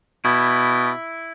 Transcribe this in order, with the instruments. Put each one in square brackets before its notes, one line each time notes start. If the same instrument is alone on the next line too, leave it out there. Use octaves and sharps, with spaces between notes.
[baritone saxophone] B2 [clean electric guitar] E4